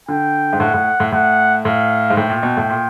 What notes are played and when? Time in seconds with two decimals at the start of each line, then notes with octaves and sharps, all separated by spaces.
0.08 D3 G5
0.53 G#2
0.60 A2 F#5
0.74 A2
1.00 A2
1.12 A2 F#5
1.65 A2 F5
2.10 G#2
2.17 A2 G5
2.30 A#2
2.43 B2
2.57 A2
2.69 A#2